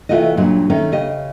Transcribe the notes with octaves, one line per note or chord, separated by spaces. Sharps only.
C3 E3 A3 F4 F#4 D#5
G2 A#2 C#3 F#3 G3
D#3 A3 C#4 D#4
C#3 G4 D#5